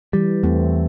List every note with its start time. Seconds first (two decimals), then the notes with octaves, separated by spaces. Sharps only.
0.13 E3 G3
0.43 E2 A3 C4